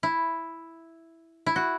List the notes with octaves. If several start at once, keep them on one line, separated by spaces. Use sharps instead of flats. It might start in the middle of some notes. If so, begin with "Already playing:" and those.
E4
E4
F#4